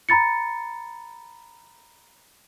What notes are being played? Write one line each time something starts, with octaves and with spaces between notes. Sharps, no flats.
A#5 B5 A6 C#7